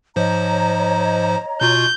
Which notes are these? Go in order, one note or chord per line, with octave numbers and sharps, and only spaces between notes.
G#2 F3 C5 C#5 D#5 A#5
B2 F4 C#6 G6